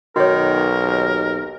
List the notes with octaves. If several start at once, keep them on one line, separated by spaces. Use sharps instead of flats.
B1 D#3 F#4 A#4 C#5
D#2